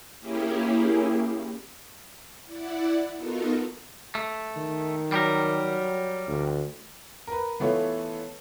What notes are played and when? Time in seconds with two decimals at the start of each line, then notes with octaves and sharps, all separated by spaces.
0.21 A#3 C#4 E4 G4 G#4
2.45 E4 D5 F#5
3.15 B3 D#4 F4 F#4 A4 A#4
4.15 A3
4.56 D#3
5.12 F#3 G3 G4 A#4
6.28 D2
7.27 A#4 B4
7.60 E3 A3 B3 F4 A4 C#5